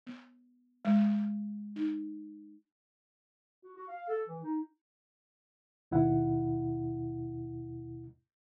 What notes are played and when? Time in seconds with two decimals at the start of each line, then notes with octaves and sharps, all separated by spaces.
0.07 B3
0.85 G#3
1.76 D#4
3.63 F#4
3.76 F#4
3.88 F5
4.08 A4
4.27 E3
4.43 D#4
5.91 D#2 B2 E4 F#5